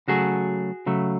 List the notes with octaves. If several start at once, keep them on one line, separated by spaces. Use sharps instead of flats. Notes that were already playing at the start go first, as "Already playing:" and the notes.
C#3 F#3 A3 F#4 G#4
C#3 F#3 A3